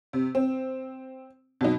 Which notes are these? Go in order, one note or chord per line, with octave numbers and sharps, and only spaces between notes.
C3
C4
B2 F#3 D#4